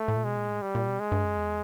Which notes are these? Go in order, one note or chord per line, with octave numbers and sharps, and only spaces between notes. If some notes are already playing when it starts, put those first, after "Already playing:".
Already playing: A3
A2
A#2
B2 G#3
A#2
A2
G3
A#2
B2
G#3
G2
F#2
E2